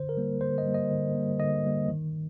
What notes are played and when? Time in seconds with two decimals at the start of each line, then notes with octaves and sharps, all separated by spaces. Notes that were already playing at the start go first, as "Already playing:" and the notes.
Already playing: D3 C5
0.09 A#4
0.17 G3 A#3
0.41 D3 C5
0.58 D#5
0.66 G3 A#3
0.74 D#5
0.91 D3
1.15 A#3
1.20 G3
1.40 D3 D#5
1.65 G3 A#3
1.89 D#3